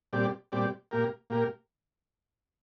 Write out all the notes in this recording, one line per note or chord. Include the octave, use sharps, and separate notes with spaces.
A#2 G3 C4 G4 D5
A#2 G3 C4 G4 D5
A#2 A#3 G4 A#4
A#2 A#3 G4 A#4